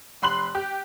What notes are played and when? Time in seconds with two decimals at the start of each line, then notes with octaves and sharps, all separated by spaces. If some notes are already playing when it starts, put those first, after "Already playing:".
0.22 F1 B5 C6 F#6 F#7
0.55 G4